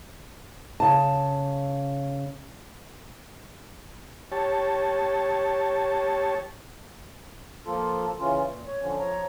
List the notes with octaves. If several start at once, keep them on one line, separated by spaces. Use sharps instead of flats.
C#3 A5
G4 C#5 A5
F3 A#3 F4 A4
C#3 E3 C#4 F4
A#2
C#5
D3 F3 C#4
F3 C#5 A#5